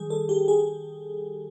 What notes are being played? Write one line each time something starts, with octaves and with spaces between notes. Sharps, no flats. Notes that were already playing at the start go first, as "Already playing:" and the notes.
Already playing: D#3 G3 G#4
A4
G4
G#4